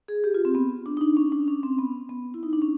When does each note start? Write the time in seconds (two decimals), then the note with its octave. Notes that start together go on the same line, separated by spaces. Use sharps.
0.08 G#4
0.24 G4
0.34 F4
0.45 C4
0.55 B3
0.86 D4
0.97 D#4
1.01 D4
1.17 C#4
1.32 D4
1.48 C#4
1.63 C4
1.79 B3
2.09 B3
2.34 E4
2.43 D#4
2.53 D4
2.62 C#4